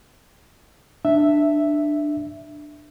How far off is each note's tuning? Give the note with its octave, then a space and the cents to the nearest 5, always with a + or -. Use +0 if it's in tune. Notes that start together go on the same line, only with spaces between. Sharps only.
D4 +15 E5 +0